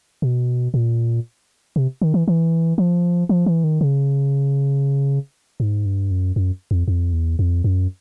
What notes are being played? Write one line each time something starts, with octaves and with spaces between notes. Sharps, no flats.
B2
A#2
C3
D#3
E3
E3
F3
F3
E3
D#3
C#3
G#2
G2
F#2
F#2
F2
F2
E2
F2
F#2